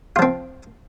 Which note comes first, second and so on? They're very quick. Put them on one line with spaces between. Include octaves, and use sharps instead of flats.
F4 F3 C4